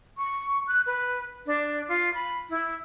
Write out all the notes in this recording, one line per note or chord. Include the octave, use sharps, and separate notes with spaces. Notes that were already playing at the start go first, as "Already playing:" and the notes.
C#6
F#6
B4
D4
F4
B5
E4